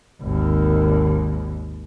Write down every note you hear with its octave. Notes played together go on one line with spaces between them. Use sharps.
G#1 D#2